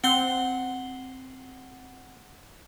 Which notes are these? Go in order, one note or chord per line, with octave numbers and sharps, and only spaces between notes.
C4 F#5 C6